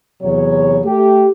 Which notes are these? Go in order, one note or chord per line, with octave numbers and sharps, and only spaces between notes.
E2 C3 F#3 C#5
A3 G4